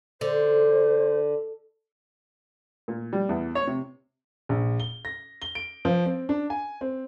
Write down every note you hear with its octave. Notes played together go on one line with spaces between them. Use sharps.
D3 C5
A#2
G3
E2
C#5
C3
A#1
G7
A#6
G7
D7
F3
C4
D4
G#5
C4